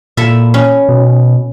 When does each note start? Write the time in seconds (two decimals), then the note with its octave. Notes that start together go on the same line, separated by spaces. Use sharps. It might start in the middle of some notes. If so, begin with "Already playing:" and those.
0.17 A#2 E4 A4 E5
0.54 C#4
0.89 B2